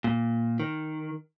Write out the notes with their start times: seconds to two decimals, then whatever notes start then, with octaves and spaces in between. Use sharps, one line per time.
0.04 A#2
0.60 D#3